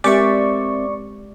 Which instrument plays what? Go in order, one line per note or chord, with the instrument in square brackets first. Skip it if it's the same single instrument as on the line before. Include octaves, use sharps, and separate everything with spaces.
[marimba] G#3 G4 [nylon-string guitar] C4 A#4 E5 [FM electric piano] D5 C#6